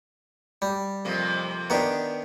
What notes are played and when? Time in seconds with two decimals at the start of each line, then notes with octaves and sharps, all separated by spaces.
0.62 G3
1.05 F2 C3 A#3
1.70 D#3 B3 D4 G4